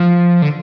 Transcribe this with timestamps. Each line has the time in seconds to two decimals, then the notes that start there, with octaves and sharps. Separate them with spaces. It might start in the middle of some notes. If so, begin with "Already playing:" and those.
Already playing: F3
0.42 D3